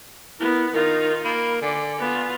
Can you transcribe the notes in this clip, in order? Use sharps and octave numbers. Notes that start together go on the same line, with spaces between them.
B3 E4 A#4
D#3 D#4 F4 A#4
A#3 B5
D3 D5 G#5
B3 F4